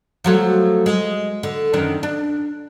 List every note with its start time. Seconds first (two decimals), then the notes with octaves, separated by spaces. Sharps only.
0.24 F3 F#3 A3
0.86 G#3
1.43 D3
1.73 F#2 D#3 D4
2.03 D4